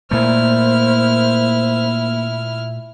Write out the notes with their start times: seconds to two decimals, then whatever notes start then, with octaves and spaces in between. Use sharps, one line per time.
0.11 A#2 A3 A#3 E4 C5 F6